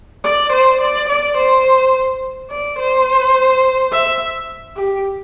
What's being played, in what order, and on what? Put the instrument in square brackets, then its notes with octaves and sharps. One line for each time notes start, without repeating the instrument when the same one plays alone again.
[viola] D5
C5
D5
D5
C5
D5
C5
E5
G4